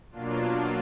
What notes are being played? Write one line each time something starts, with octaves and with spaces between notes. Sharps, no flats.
B2 F#3 A#3 D4 F4